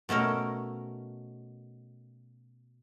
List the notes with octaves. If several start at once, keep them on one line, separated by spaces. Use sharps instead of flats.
B2 A3 C#4 A#4